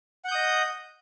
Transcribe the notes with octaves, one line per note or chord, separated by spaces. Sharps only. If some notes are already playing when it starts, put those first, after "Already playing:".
D#5 F#5 D#6 G6